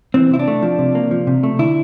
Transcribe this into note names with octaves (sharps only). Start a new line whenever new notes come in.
E3 C4
C3 E4
D4
A3
F3
C3
A#3
F3
C3
A3
D3 E4